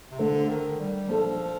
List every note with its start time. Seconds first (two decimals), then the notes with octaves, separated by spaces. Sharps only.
0.11 C3
0.19 D3 A3 D4 A4 C5
0.49 D#3
0.79 G3
1.09 F3 A#3 D4 A4